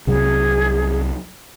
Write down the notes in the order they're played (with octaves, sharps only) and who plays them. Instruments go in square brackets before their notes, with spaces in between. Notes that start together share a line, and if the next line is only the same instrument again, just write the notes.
[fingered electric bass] C2 C3 F#3 [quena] G#4